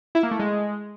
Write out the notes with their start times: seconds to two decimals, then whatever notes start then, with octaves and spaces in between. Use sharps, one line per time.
0.15 E4
0.23 A#3
0.31 A3
0.40 G#3